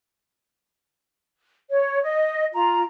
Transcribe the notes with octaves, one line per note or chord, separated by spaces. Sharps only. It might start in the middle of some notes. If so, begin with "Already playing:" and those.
C#5
D#5
F4 A#5